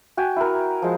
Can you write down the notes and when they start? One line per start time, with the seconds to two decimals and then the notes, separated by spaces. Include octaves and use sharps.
0.17 F#4 G5 G#5
0.36 E4 A#4
0.82 F3 G#3